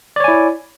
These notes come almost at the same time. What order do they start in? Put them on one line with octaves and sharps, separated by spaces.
D5 C#5 G#5 E4